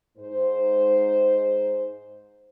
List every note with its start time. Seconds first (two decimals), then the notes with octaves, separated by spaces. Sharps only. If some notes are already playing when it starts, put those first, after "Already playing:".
0.17 G#2 C5